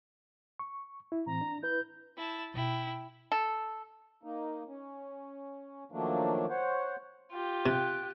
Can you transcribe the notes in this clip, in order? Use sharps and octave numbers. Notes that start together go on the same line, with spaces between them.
C#6
E4
A2 E3 C4 A#5
D4
E4 B4 G6
E4 A5
B2 D#4 E4 G5
A4
A#3 D#4
C#4
D#3 F3 F#3 A3 A#3 D4
C5 C#5 F#5
F4 G4
C3 G5 F#6